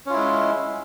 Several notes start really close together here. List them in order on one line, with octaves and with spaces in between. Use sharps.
C#4 F4 E4 G#3